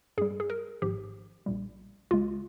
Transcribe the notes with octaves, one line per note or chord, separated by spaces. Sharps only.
G2 G3 G#4
G#4
A#4
G#1 G#2 F3 G4
A#1 A#2 G3
C#2 C#3 G#3 F4